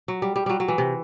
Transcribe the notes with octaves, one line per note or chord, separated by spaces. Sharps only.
F#3
G3
G3
F#3 G3
F#3
E3
C3